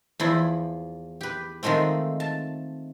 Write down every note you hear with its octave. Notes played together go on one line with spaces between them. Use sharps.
E2 F3 E4
G4 B4
D#3 F3 G#3 A3 C4
A5